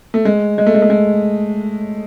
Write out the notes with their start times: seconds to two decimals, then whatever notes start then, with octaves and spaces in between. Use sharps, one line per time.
0.14 A3
0.25 G#3
0.58 G#3
0.66 A3
0.74 G#3
0.82 A3
0.90 G#3